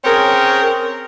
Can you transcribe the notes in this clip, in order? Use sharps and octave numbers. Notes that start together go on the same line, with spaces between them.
C4 C#4 G#4 A#4